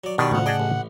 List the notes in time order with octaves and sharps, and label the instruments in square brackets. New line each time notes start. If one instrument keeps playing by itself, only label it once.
[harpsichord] F#3 D5
[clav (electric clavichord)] B2 D#3 [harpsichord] D4 G4 B4 [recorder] D5
[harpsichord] D2 F3 [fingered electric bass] A2 C#3 [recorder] F#5
[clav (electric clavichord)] G#4 D#5 A5 [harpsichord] D5 G5
[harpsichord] A1